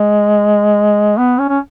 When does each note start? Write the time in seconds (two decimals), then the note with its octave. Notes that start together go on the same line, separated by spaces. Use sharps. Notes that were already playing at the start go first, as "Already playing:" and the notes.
Already playing: G#3
1.18 B3
1.38 C#4
1.49 C#4